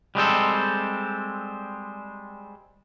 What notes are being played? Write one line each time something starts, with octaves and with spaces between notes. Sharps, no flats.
G3 G#3 C4 A4